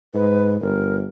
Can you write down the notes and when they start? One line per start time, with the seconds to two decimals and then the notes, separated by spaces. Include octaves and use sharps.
0.14 G#2 B4
0.61 G1 A#4